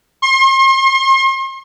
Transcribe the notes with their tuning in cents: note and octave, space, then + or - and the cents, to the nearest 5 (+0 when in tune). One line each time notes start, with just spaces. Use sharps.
C6 +40